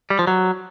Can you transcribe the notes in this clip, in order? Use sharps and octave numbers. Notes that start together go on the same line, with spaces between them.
G3
F3
F#3